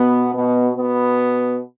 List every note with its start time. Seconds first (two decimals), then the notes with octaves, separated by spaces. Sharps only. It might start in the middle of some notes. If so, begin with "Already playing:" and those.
Already playing: B2 B3
0.34 B2 B3
0.75 B2 B3